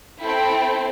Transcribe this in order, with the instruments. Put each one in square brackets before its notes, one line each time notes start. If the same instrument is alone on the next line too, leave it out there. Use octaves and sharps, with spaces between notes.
[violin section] C4 E4 A4 G5